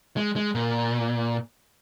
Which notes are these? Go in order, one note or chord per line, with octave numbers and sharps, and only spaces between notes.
G#3
G#3
A#2